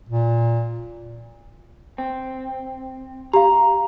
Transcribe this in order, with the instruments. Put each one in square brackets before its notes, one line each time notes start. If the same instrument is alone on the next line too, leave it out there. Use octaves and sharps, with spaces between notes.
[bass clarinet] A#2
[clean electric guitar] C4
[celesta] G4 F5 [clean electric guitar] A#5